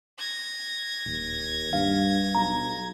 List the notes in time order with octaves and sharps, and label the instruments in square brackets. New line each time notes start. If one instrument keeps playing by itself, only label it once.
[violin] G#6 A#6
[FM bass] D1 [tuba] D#2
[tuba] G2 [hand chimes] F5
[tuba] B1 [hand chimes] A#5